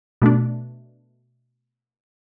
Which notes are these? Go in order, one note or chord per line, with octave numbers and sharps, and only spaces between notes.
B2 A3 D4